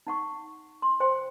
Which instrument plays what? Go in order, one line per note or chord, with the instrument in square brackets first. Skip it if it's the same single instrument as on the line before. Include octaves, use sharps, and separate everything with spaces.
[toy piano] D#4 F#5 C#6
C6
C5 G5 C6